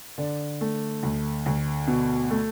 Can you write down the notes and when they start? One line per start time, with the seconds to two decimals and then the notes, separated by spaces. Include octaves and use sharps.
0.18 D3 D5
0.61 A3
1.03 D2
1.46 D2
1.87 B2
2.31 A3